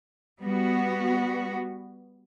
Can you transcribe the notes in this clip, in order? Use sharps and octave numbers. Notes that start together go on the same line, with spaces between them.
G3 B3 F#4